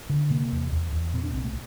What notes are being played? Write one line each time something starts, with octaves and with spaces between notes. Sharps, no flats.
D3
C3 A#3
E2
E2
E2
A#2 C4
D4
C2 C4
A3